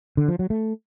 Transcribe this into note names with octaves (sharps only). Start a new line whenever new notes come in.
D3
F3
F#3
A3